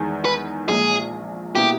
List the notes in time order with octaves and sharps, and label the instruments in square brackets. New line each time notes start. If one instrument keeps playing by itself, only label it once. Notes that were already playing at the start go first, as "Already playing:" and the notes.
Already playing: [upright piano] E2 D#3 G#3
[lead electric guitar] B4
[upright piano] A#1 A#2 G#3 [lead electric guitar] G#4
[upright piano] B2 A#3 E4 [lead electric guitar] G4